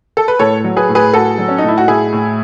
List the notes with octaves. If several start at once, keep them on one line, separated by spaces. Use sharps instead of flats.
A4
B4
A2 A4 C#5
F#3
G#4 B4
A2
G#4 B4
A2 F#4 A4
F#3
C#4
A2 D#4
E4
F#4
A2 E4 G#4
A2